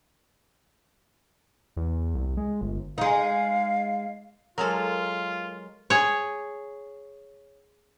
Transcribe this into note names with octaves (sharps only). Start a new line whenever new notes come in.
E2
C2
G#3
G1
G#3 D#4 F5
F#3 G#3 F4 A4 A#4 F6
G#4 C#5